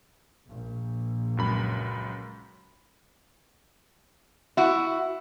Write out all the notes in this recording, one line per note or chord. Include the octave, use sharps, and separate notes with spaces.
A#1
C#2 F#2 B5
E4 F#4